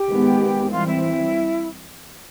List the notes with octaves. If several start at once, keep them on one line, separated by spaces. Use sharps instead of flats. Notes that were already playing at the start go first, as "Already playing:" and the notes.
Already playing: G4
D#3 G#3 B3
E3 G3 C4 F4
E4